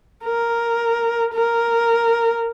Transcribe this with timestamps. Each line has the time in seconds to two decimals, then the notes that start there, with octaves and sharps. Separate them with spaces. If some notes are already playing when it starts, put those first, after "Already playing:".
0.24 A#4
1.34 A#4